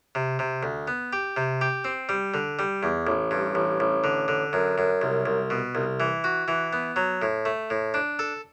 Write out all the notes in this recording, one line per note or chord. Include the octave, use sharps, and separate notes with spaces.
C3
C3
D2
B3
G4
C3
G4
C4
G3
D3
G3
E2
A1
G2
A1
A1
D3
D3
F#2
F#2
C2
C2
B2
C2
E3
F#4
E3
B3
F#3
A2
A3
A2
D4
A4